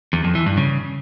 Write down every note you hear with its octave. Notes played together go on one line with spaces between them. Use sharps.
E2
F2
E3
G2
C#3